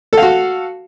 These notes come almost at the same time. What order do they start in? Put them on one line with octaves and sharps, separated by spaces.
A4 F5 F#4